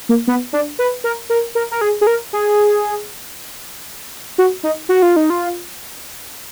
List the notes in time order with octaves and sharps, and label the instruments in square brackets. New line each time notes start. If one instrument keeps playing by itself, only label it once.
[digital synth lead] A#3
B3
D4
B4
A#4
A#4
A#4
A#4
G#4
G#4
A#4
G#4
F#4
D#4
F#4
F4
D#4
F4